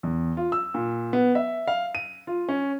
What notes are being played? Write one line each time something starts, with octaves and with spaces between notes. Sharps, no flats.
E2
F4
E6
A#2
B3
E5
F5
D#7
F4
C#4